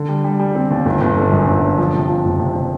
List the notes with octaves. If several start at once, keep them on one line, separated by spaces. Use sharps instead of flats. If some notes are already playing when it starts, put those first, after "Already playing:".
Already playing: D3
G3
G3
G3
C4
D#2
G1
G1
D3
F#2
G1
D3
F3
C3
F3
F#1
C3
C3